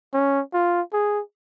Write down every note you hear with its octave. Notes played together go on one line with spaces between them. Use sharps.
C#4
F4
G#4